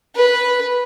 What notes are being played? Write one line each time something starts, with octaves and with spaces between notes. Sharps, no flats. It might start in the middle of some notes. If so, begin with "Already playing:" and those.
B4